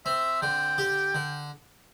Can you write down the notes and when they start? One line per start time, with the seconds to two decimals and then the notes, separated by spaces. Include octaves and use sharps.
0.06 C4 E5
0.42 D3 G5
0.78 G4
1.15 D3